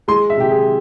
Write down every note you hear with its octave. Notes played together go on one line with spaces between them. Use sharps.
G#3 C6
E5
C3 G4
G#4